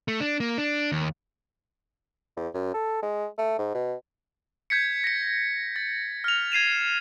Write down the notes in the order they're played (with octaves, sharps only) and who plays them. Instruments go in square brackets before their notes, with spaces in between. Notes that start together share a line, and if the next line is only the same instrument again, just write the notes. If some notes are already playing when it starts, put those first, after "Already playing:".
[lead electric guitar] A3
D4
A#3
D4
D#2
[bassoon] E2
F#2
A4
G#3
A3
G#2
B2
[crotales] G6 G#6 B6 C#7
A#6 C#7
A6
F6 F7
G#6 C7 D#7 E7